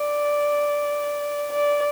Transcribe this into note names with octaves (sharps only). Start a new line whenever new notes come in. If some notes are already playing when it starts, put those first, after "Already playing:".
Already playing: D5
D5